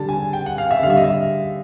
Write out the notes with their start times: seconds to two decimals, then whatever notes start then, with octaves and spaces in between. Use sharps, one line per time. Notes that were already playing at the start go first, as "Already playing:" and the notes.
Already playing: D3 G3 A5
0.09 G#5
0.33 G5
0.46 F#5
0.58 F5
0.71 E5
0.82 D3 F5
0.86 G3 E5
0.97 D#5
1.04 E5